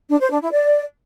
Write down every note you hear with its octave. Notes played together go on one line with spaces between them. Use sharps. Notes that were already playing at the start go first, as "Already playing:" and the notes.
D4
C5
D4
E4
D5